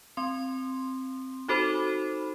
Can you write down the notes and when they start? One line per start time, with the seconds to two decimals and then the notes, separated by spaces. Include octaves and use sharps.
0.17 C4 C6
1.48 D#4 F#4 A4 C5 B5